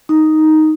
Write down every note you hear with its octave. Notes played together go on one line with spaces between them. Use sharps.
D#4